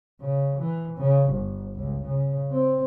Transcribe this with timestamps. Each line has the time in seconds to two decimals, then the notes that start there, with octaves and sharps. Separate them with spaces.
0.21 C#3
0.59 E3
0.98 C#3
1.30 G1
1.75 C#2
2.04 C#3
2.51 C4